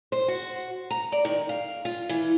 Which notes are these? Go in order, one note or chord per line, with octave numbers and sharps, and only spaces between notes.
C5
F#4
A#5
D5
D#3
F5
F4
E3